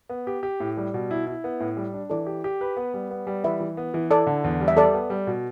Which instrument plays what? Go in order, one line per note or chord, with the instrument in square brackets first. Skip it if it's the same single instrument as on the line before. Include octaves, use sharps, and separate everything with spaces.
[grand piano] B3
G4
G4
A2
G3
B2
E4
E4
B3
A2
G3
D4
[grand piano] E3 [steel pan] A4 D5
[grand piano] G4
G4
B4
B3
G3
B3
G3
[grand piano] E3 [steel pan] B4 E5
[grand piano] E3
B3
E3
[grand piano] E4 [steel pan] A4 D5
[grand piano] D3
E2
G3
[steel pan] E5
[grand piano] G3 [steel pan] A4 D5
[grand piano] B3
G3
B2